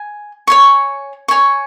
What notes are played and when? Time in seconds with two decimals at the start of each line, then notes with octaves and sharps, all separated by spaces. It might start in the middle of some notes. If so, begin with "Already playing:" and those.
Already playing: G#5
0.47 C#5 G#5 C#6
1.28 C#5 G#5 C#6